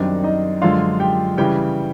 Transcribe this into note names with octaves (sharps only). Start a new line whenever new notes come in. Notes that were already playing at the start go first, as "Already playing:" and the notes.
Already playing: F#2 D#3 G3 C4 D4 D#4 D5
D#4 D#5
F#2 D3 F3 G#3 F4 F5
G4 G5
C#3 E3 G3 G4 G5